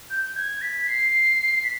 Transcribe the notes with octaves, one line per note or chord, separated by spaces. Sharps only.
G6
G#6
B6
C7
B6